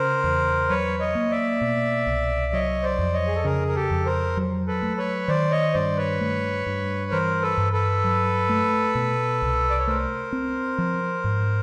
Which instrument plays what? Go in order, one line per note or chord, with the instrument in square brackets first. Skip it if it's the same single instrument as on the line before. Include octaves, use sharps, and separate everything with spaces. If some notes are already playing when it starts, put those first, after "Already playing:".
Already playing: [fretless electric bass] C#3 [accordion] A#4 C5
[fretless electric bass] E2
[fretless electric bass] F#3 [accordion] B4 C#5
[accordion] C#5 D#5
[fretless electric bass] A#3
[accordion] D5 E5
[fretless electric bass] B2
C2
[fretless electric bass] F#3 [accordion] C#5 D#5
[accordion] C5 D5
[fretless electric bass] F2
[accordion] C#5 D#5
G#4
A4
[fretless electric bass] C#3 [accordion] G#4 A#4
[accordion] A#4
G4 A4
[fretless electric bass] F2
[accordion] A#4 C5
[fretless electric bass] F#3
[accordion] A4 B4
[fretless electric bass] A3
[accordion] B4 C#5
[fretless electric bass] D#3 [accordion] C5 D5
[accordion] C#5 D#5
[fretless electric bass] G2 [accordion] C5 D5
[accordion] B4 C#5
[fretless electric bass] A3
G2
[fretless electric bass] E3 [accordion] A#4 C5
[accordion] A4 B4
[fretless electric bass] G2
[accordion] A4 B4
[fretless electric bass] F#3
A3
B2
C2
[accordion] D5
C#5
[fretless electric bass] A3 [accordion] A#4 C5
[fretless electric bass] C4
F3
G#2